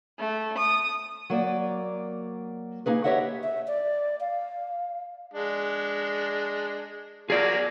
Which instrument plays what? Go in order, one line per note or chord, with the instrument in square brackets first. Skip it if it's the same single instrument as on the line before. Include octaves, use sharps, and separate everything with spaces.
[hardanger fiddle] A3
D#6
[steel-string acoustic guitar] F#3 A#3 D5
A#3 D#4 G#4 B4
G4 B4 C#5 D#5 E5 F#5
[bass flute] E5
D5
F5
[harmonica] G#3 D4
[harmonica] F3 F#3 A#3 [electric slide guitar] G#4 D5